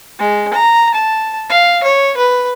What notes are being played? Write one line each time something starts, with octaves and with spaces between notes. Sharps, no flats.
G#3
A#5
A5
F5
C#5
B4